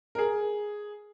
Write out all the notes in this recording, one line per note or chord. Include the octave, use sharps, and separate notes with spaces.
A#4
G#4